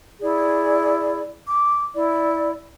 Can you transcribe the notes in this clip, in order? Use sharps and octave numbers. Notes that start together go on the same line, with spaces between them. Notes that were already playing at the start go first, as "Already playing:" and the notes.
E4 G#4 D5
D6
E4 D5